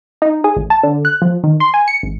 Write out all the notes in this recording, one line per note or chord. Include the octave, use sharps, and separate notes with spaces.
D#4
G#4
A1
A5
D3
F#6
F3
D#3
C6
G#5
C#7
G#1